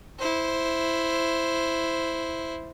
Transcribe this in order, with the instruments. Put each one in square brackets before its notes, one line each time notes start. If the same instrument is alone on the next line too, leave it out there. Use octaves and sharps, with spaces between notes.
[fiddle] E4 C5